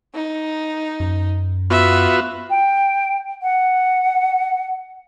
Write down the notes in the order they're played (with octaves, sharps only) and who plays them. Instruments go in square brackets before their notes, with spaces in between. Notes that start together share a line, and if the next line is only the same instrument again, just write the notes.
[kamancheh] D#4
[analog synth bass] F#2
[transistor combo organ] B3 F4 F#4 [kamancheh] E5
[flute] G5
F#5